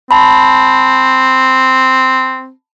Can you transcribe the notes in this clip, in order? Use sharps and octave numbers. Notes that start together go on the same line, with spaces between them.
C4 A5 B5